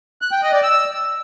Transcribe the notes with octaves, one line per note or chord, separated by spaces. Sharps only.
F#6
G5
D#5
D5
E6